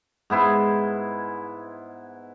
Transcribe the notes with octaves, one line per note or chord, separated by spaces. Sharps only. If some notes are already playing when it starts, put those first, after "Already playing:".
G#2 B3 E4 C6